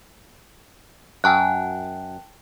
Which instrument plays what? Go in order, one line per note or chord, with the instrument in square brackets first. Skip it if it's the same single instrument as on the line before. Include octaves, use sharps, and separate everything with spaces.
[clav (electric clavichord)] F#2 [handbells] G5 A5 F#6